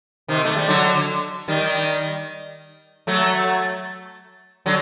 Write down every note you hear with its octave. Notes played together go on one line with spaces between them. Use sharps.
C3 D#3
A3
G3
D3 F#3
D#3 G3
F#3 A3
D3 F#3